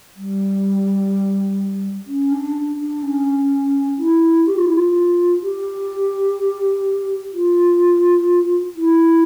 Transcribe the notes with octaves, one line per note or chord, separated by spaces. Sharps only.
G3
C#4
D4
D4
C#4
E4
G4
F4
E4
F4
G4
F4
E4